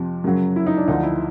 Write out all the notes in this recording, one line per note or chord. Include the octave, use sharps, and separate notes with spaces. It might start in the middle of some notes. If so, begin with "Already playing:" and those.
Already playing: F2 C3 F3
F#2 C#3 F#3
E4
D#4
D4
D2 D3 F3 D#4
E4